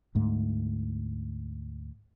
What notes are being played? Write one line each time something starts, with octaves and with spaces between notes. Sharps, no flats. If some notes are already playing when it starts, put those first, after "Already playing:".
D2 G#2 A3